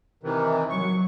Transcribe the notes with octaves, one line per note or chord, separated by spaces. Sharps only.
C3 D#3 E3
F#3 C#6